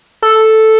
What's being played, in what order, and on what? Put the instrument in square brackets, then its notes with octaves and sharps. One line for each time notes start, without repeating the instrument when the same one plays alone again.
[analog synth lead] A4